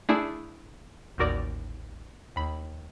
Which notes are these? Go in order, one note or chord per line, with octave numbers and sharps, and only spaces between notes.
A3 D4 E4 G#4
A1 D#2 F#4 A#4 D5 D6
D#2 B5